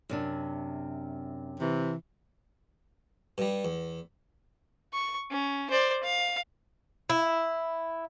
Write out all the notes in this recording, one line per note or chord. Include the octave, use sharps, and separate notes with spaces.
F#2 C3 D4
C3 E3
G2 G3
E2
C#6
C#4
C5 D5
F5
E4